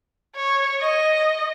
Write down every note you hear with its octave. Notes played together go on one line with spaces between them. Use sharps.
C#5
D#5